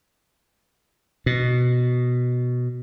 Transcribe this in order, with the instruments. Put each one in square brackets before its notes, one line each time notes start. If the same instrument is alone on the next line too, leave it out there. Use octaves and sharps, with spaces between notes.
[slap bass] B2